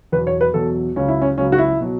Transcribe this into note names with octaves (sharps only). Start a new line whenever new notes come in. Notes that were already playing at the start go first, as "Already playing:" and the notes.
E2 B2 F#3 B4
C#5
B4
E2 B2 F#3 A4
C#2 C#3 F#3 C#4
E4
C#4
C#2 C#3 F#3 C#4
F#4
E4
B2 F#3